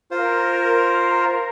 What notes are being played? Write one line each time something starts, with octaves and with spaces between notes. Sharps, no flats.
F4 A#4 C5